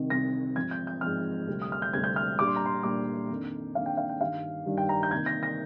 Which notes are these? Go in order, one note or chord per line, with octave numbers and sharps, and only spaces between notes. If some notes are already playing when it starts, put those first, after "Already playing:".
Already playing: C2 C3 D#3
C2 C3 D#3 A#6
G#2 F3 C4 G#6
G6
G6
G#2 F3 C4 F6
D2 C3 G3 C4
D#6
F6
G6
D2 C3 G3 C4 G#6
G6
F6
A#2 G3 D4 D6
C6
A#5
C6
A#2 G3 D4 D6
F2 D#3 A#3 D4
F2 D#3 A#3 D4 F5
G5
F5
G5
G2 D#3 G3 D4 F5
G2 D#3 G3 D4
G5
A#5
G6
C3 D#3 A#3 G#6
A#6
A#6